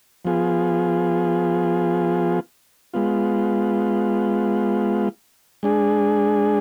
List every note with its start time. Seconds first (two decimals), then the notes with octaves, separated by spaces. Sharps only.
0.25 F3 B3 F4 G#4
2.94 G#3 B3 F4
5.63 G#3 D4 G#4